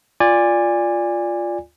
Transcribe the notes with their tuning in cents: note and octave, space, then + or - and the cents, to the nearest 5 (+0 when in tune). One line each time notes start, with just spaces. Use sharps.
F4 +0 D5 +0 G#5 -25